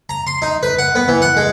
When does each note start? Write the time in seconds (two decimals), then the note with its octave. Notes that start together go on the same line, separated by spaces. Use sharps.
0.09 A#5
0.27 C6
0.42 D#4
0.63 B4
0.79 F#5
0.95 B3
1.08 E3
1.22 F#5
1.37 G#3